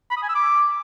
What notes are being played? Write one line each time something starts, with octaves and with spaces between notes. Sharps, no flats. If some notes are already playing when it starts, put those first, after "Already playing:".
B5
D#6
G#5
E6
D6